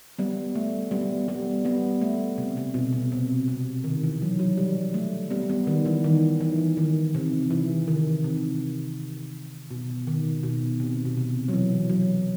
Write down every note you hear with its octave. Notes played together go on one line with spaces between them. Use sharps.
G3 B3
A3
G3 B3
G3 B3
G3 B3
A3
C3
C3
B2
C3
C3
C3
D#3
E3
F#3
F#3
G3
A3
G3 B3
G3 B3
D#3
E3
D#3
E3
D#3
C3
E3
D#3
C3
B2
D#3
B2
C3
B2
C3
F#3
E3
F#3